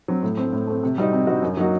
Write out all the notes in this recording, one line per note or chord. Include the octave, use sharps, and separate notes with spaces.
F#3 C4
A2
A3 C4
A2
A3 C4
C3
G3 C4 D#4 F#4
C3
G3 C4 D#4 F#4
F#2
F#3 A#3 D#4 F#4